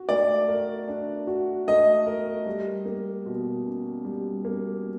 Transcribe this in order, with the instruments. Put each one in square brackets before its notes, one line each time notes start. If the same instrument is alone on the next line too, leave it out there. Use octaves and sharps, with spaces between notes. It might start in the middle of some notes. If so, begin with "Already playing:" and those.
Already playing: [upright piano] F#4
[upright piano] A3 [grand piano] D5
[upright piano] A#4
D4
F#4
[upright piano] A3 [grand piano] D#5
[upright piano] A#4
G3
A#3
B2
C#4
G3
A#3